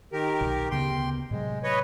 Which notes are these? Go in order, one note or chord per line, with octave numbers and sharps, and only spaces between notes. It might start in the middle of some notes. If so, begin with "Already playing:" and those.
D#3 G4 A#4
B1 B2
D2 C#3 B3 G5 C6
A2 C3 F#3 G#3
B4 C#5 D#5